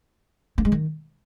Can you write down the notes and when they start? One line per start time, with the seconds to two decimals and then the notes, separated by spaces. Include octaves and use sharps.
0.58 A#3
0.65 G#3
0.72 D#3